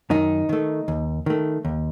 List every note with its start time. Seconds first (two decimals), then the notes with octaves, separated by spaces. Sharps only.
0.10 F#2 D#3 D#4
0.49 D#3 A3
0.88 D#2
1.26 D#3 A3
1.65 D#2